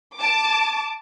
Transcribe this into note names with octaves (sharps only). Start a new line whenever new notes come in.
A5 D6